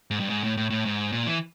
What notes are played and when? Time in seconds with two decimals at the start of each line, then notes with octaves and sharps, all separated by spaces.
0.11 G#2
0.20 G2
0.29 G#2
0.43 A2
0.57 A2
0.70 A2
0.85 G#2
1.12 A#2
1.26 E3